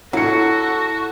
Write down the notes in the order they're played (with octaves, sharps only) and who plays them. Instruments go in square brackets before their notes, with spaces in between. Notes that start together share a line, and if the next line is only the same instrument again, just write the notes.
[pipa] F#3 [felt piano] E4 C#7 [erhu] F#4 [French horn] A4